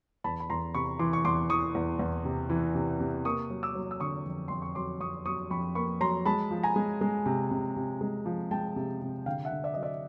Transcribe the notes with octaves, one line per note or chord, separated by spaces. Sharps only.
E2 A5 B5
B5
E2 A#5 C6
C3 B5 C#6
E3 C6 D6
C#6
E2 C6 D6
E3 C#6 D#6
E2
E2
C3
E3
C3
C3
A#3 C#6 D#6
F#3
D6 E6
F#3
E6
D3 C#6 D#6
F2
F2 C6
C#6
F#3 C6 D6
F2 C#6 D#6
F#3 C#6 D#6
F2 B5 C#6
A#3 B5 C#6
F#3 A#5 C6
G#3 A5 B5
F3
G#5 A#5
G#3
G#3
C3
C3
C3
G#3
F3
G#3 G5 A5
C3
C3
D3 F5 G5
E5 F#5
D3
D5 E5
F#3 D#5
D5 E5